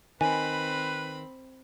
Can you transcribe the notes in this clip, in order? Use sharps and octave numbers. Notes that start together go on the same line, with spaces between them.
D#3 C4 B4 G#5 B5